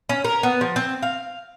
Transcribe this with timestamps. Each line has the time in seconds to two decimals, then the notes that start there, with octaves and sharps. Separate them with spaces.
0.09 C#4
0.25 A#4
0.43 B3
0.61 F3
0.76 C4
1.03 F5